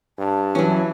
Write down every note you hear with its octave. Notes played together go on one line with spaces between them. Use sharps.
G2 A5
E3 F#3 C#4